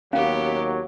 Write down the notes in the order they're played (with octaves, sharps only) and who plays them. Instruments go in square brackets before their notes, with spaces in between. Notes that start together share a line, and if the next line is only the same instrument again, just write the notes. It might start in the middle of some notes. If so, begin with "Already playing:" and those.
[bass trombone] D#2 [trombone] F#3 [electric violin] B3 G4 [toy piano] C#4 F5